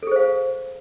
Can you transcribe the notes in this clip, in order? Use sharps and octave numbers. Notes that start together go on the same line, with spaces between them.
G#4 A4 C5 F5